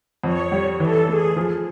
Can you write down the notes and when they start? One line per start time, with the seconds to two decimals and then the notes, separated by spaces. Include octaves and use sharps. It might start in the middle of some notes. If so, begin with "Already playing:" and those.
0.24 F2 C#5
0.52 G3
0.80 E3 A4
1.08 A3 G#4
1.36 F3